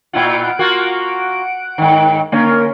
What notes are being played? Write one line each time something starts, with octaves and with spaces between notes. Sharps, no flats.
A#2 E4 F4 F#5 D7
A#3 F4 F#4
G#2 D#3
D3 A#3 C#4 A#4